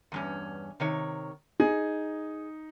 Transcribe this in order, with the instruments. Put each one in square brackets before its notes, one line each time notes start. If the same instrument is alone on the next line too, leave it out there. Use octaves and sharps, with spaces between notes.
[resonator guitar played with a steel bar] E2 G2 C#4
C3 D#3 C#5
[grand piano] D#4 [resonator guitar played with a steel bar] G#4